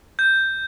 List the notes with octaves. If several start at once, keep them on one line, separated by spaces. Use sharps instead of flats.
G6